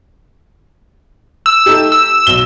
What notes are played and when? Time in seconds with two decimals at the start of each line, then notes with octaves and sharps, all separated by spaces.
1.46 E6
1.66 A3 D#4 G4
1.92 E6
2.27 B1 G7